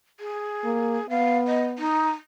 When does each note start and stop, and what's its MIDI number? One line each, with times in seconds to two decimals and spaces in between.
0.20 1.07 68
0.65 0.98 58
1.10 1.87 59
1.10 1.37 77
1.47 1.67 75
1.78 2.10 63